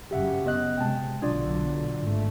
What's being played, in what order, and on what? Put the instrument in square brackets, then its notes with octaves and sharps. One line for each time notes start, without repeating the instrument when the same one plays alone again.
[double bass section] F#2 C#3 [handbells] G4 E5 F#5
[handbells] B3 D#5 F#6
[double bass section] C3 G#3 [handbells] G5 A5
[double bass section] B1 D3 F#3 [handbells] D4 F4 D5
[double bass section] G#1 A3